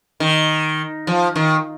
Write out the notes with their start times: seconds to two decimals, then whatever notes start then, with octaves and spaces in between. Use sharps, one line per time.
0.20 D#3
1.07 F3
1.36 D#3